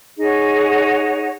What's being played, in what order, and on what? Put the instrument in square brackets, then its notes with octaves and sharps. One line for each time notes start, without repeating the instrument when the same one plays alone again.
[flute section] D#4 G#4 C#5 F#5